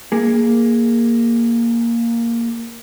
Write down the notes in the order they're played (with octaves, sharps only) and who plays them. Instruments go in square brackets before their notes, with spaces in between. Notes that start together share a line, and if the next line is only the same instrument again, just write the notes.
[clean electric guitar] A#3 G#4